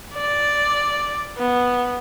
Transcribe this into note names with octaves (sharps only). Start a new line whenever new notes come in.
D5
B3